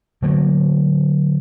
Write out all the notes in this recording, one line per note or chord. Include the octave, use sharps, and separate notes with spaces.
D3 F#3 A3 A#3